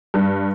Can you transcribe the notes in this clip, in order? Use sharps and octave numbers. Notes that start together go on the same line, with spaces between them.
G2